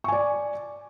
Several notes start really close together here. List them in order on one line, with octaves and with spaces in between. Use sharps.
C#6 G#5 D5